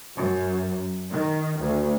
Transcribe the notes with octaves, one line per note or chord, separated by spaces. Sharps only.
F#2
D#3
D2